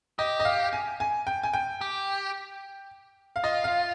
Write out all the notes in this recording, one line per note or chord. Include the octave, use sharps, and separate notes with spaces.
G4 D#5
D#5
F5
G#5
G#5
G5
G#5
G5
G4
F5
F4 D#5
F5